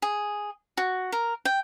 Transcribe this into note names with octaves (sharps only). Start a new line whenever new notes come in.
G#4
F#4
A#4
G5